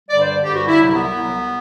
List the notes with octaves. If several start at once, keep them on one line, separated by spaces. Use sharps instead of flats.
G2 D3 G3 D5
C5
G2 D3 G3 G4
F#4
E4
C2 C3 F#3
B3
C2 C3 F#3